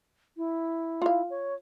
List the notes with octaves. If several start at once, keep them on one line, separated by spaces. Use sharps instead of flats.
E4
F4 F5
C#5